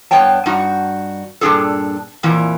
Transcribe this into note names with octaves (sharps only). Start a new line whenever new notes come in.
G2 B3 C#5 G5 A5
G2 D#4 F#4
G2 A#2 F#3 D4 G#4 A4
F2 A#2 E3 A#3